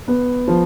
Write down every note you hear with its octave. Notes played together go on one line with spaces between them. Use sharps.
B3
F3